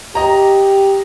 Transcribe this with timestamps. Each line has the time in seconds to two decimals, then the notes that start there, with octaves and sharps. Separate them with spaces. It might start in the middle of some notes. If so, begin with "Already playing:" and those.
0.15 G4 D#5 A#5